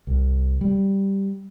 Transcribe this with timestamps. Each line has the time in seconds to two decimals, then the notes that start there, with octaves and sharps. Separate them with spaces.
0.07 C2
0.61 G3